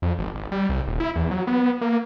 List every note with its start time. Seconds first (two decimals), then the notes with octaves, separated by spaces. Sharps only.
0.02 F2
0.19 G#1
0.34 G#1
0.52 G3
0.69 C2
0.88 D#1
1.00 E4
1.16 E2
1.31 F#3
1.47 B3
1.81 A#3